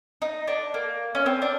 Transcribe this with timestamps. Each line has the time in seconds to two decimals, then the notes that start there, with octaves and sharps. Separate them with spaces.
0.22 D#4
0.47 D4
0.74 A#3
1.15 C#4
1.26 C4
1.42 D4